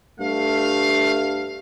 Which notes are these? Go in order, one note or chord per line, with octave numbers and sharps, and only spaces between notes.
G2 A3 F5